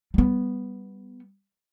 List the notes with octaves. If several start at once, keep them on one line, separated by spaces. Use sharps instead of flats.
G3 B3